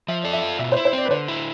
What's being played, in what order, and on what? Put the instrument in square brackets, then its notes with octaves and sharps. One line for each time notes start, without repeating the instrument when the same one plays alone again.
[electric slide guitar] F3 [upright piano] E5
[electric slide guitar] A4 [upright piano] D5
[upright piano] E5
[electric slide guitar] F4
[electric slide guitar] B2 [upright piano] E5
[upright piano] C5
[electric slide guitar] E4
[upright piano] C5
[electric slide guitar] C4 [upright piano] D5
[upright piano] B4
[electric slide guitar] D3 [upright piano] C5
[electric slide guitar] E4